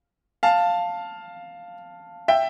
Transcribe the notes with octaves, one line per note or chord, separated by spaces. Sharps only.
F5 A5
E5 G5